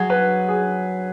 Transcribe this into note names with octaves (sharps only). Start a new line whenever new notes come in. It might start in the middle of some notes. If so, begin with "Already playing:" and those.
Already playing: F#3 G#4
B4
G#4